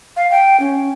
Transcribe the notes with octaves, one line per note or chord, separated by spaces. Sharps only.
F5
G5
C#4